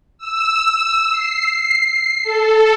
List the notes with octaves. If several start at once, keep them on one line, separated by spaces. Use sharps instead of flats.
E6
C7
A4